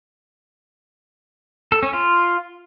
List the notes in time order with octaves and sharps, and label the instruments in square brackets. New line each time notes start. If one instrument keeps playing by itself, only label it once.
[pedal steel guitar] A4
C#4
F4